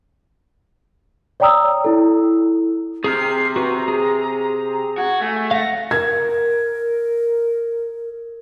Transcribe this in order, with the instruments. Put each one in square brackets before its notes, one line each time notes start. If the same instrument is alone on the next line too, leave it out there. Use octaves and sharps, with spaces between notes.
[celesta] C#5 D5 G5 A#5 D#6 E6
E4 A4
[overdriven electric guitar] C3 [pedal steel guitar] G#4 A#5 F6 [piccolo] C7
[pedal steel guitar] F#4 B4 [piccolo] A#5
[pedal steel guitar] G#4
[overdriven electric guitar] F#4 [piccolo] G#6
[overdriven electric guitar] A3 [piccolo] G#5
[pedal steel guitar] F5 F#5 [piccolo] A#6
[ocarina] A#4 [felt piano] G#6